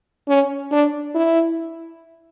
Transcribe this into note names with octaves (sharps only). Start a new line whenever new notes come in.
C#4
D4
E4